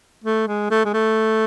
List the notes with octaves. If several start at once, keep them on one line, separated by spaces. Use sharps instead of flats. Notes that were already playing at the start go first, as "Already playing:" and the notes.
A3
G#3
A3
G#3
A3